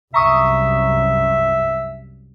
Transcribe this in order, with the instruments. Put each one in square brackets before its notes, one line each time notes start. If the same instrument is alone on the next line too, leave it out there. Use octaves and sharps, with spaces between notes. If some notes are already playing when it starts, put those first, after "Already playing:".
[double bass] C2 F#2 [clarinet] E5 [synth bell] A#5 C#6 D#6